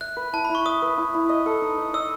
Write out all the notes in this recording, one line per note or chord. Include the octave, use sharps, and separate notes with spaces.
E5 F#6
B4
E4 A5
E4 B5
C#6
E5 D#6
B4
E4
E4
D#5
A4
D#4
D#4
D#5 E6